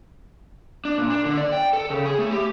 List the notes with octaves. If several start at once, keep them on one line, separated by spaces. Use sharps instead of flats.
D4
A#2
D4
D3
D5
G5
A4
C#3
G#4
A3
G4